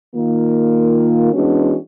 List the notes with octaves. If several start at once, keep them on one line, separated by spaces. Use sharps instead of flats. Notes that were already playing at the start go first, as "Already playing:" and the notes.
D#3 A#3 F4
E3 G#3 B3 C#4 D4 F#4